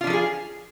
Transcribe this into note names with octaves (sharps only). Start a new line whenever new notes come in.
F3 D4 F4 G#4 A4